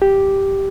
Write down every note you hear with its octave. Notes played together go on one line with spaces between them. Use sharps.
G4